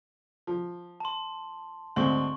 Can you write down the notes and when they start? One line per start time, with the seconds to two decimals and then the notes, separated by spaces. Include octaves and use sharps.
0.47 F3
1.00 A5 C6
1.96 D2 G#2 C4 C6 C#6